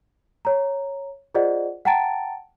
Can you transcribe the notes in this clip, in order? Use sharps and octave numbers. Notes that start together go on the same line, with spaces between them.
C#5 A#5
F4 G#4 C5 D5 D#5 F#5
F#5 G5 A5 A#5 A6 D7